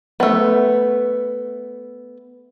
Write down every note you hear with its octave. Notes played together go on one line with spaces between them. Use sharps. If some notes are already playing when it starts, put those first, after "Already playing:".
A3 B3